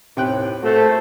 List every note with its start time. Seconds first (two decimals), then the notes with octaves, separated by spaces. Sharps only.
0.17 D#2 A2 C3 G5 F#6
0.63 A#2 A3 F#4 C5